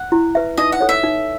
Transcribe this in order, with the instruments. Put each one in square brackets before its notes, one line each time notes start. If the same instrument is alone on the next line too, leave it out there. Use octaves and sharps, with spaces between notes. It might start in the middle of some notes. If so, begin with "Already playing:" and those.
Already playing: [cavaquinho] F#5
[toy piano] E4
B4 E5
[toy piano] D#4 [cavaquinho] D#5
[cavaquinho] F#5
[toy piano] A4 C#5
[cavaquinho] E5
[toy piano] D#4